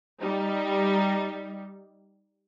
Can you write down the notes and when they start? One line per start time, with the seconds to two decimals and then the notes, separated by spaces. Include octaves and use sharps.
0.22 G3 D#4